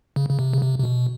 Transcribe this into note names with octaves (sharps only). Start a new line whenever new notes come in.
C#3
C#3
C3
C#3
C3
C3
B2